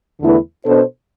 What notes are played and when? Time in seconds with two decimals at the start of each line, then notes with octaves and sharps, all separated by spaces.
0.20 E2 D3 A3 E4 B4
0.65 B2 B3 D4 A4 C5